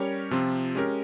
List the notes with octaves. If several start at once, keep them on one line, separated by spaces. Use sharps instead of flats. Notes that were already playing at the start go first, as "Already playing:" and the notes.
Already playing: G3 C#4 G4 A#4 C#5
C3 F3 C4 F4
G#3 C#4 G4 A#4